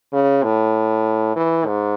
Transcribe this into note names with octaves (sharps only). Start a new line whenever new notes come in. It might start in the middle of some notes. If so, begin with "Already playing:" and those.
C#3
A2
E3
G#2